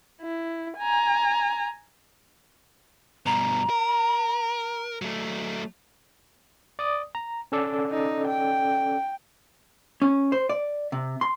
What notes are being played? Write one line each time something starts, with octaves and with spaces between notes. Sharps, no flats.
E4
G#5 A#5
G2 B2 A#5
A#4
F#3 A3
D5 D#6
A#5
C#4 A4 D5
D#4
G5
C#4
C5
D5
C3
C6